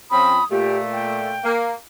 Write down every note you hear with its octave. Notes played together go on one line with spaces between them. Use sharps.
F3 C4 C#4 B5 D#6
A#2 A3 G4
G5
A#3